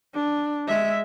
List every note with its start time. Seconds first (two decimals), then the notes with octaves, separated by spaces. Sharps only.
0.14 D4
0.68 G#3 E5